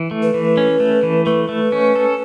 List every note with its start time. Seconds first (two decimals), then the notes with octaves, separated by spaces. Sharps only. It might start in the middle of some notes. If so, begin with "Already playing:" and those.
Already playing: E3
0.11 A3
0.23 B4
0.34 E3
0.57 C#4
0.80 A3
1.03 E3
1.26 A3 B4
1.49 A3
1.72 C#4
1.95 A4